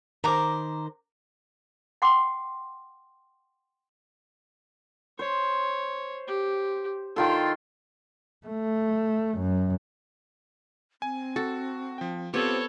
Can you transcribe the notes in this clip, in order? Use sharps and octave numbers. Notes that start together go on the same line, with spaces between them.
D#3 A#4 C5 A#5 D6
F#5 G5 C6 D6
C5 C#5
G4
D#3 F4 A4 G5 C6
A3
F#2
C4 G#5
F#4 A4
F3 G5
B3 C4 F4 G4 A4 C5 C#5